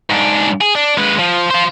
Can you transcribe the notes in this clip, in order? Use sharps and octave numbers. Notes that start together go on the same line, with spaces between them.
G#2 D4
G#4
D4
G#3 B4
F3
F4 C5